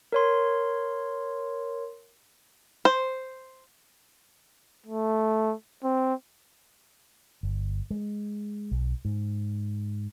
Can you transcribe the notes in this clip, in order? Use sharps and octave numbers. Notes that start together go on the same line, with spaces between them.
A#4 C#5 C6
C5
A3
C4
G1
G#3
B1
G#2